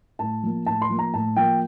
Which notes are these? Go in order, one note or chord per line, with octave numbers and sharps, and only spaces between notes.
A2 A5
F3 A#3
A2 A5
C6
F3 A#3
A#5
A2 A5
F3 A#3 G5